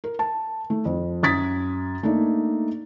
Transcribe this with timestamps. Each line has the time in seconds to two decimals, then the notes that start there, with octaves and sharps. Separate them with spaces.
0.04 A#4
0.19 A5
0.70 A3
0.85 F2
1.23 F#2 D#6 G#6 A6 B6
2.03 A3 A#3 D4 D#4